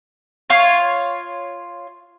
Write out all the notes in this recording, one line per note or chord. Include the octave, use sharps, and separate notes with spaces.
F4 C#5